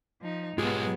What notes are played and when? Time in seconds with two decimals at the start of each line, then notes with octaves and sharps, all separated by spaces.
0.22 F3 D#4
0.58 B1 G#2 G#3 B3 F4 G4